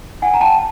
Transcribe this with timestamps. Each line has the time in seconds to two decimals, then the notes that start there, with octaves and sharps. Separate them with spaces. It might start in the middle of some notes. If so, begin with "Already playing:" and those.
0.22 F#5 G#5
0.34 A#5
0.41 G5 A5